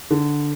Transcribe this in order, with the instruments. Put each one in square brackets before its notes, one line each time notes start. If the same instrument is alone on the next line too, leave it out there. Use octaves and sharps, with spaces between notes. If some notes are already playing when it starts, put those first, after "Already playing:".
[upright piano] D3